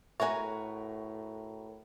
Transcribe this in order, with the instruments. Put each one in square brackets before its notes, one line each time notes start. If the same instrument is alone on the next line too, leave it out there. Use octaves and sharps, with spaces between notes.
[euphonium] A2 [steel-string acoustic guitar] F#4 A#4 B4 [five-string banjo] C#5 G#5 [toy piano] E5